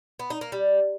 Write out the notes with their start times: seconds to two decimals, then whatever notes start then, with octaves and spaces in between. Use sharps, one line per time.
0.19 B3
0.30 D#4
0.41 A#3
0.52 G3